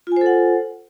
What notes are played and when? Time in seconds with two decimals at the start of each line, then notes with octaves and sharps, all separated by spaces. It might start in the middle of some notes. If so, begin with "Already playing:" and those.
0.07 F4
0.12 G#5
0.17 C5
0.21 A4
0.26 F#5